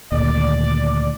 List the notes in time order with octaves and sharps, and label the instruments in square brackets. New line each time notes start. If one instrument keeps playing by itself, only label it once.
[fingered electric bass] D2 A#2 D#3 [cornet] D5